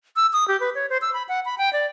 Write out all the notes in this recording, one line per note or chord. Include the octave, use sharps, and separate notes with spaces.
E6
D#6
G4
B4
C#5
C5
E6
B5
F#5
B5
G5
D5